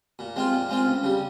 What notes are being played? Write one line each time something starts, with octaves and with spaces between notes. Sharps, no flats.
A#2
G#3 C4 F4
A#2
G#3 C4 F4
C#2
C#3 G3